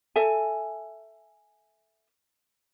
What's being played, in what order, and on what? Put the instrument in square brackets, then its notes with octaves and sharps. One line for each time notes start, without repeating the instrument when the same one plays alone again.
[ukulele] A4 E5 G#5